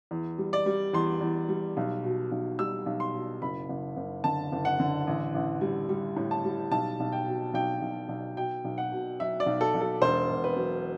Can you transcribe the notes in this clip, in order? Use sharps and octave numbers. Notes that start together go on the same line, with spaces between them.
E2
G3
D5
G3
E2 C6
E2
G3
B1
B2
B1
G3 E6
B1
C6
B2
F#1 B5
F#1
F#1
D3 A5
F#1
F#5
D3
A1
A1
G3
G3
A2
A5
G3
B1 A5
B1
G5
B2
B1 G5
B1
B1
B2 G5
B1
F#5
B2
F#3 E5
D5
B1
A4
B1
A4
E1 C5
E1
B4
F#3